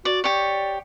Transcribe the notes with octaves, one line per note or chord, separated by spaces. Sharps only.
F#4 D5
G4 C#5 D5